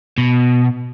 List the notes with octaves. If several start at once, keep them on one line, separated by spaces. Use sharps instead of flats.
B2